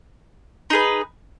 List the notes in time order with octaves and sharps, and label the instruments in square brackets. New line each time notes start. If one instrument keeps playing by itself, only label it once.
[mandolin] D#4 G#4 B4